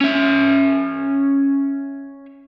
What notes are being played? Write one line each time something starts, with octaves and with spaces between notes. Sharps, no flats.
C#4 E5